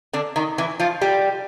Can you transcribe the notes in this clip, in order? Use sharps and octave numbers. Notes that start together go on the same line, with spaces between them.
D3 D4
D#3 D#4
E3 E4
F3 F4
G3 G4